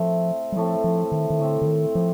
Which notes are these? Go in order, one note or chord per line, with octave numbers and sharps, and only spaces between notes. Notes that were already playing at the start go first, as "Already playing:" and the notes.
Already playing: A2 F3 A3 C4
G3
A2 F3 A3 C4
F3
D#3
D#3
A2 D3 A3 C4
D3
D#3
F3